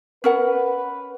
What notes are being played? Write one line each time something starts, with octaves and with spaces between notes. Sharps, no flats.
C#4 A#4 B4 F#5